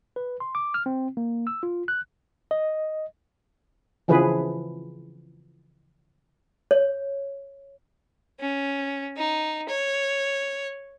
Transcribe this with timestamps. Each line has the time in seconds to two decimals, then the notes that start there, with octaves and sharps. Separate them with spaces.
0.16 B4
0.40 C6
0.55 D6
0.74 F6
0.86 C4
1.17 A#3
1.47 E6
1.63 F4
1.88 F#6
2.51 D#5
4.08 C#3 E3 F3 G#4 B4
6.71 C#5
8.40 C#4
9.17 D#4
9.68 C#5